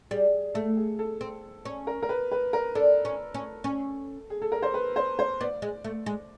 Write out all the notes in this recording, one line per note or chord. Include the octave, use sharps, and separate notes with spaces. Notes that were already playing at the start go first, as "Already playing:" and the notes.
G3 G#4
A3 A4
G#4
A4
C4
C#4
A#4
A#4
B4
B4
A#4
D4 A4
C#4
C#4
C#4
G#4
A4
A#4
C5
B4
C5
C5
B3 D5
G#3
A3
G#3